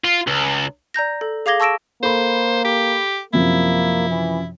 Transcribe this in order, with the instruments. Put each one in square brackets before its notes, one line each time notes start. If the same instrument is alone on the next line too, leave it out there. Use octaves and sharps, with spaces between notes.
[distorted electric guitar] F4
C#2
[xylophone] D5 A#5 G6 A#6
A4
G#4 F5 D6 G#6 A#6 G7
A5 C#6 E6 A#6 D7 E7
[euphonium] A#3 [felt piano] A4 B5 [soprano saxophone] C5
[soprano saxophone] G4
[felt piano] F#2 C3 F3 [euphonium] A#3 [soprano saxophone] E4
[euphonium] E3